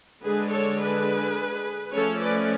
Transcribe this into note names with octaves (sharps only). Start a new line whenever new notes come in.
D3 G#3 D4 G#4 B4
A4 C#5
G#4 B4
F3 A3 C#4 A4 C#5
B4 D5